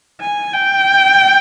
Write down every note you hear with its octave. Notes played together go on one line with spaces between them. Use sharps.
G#5
G5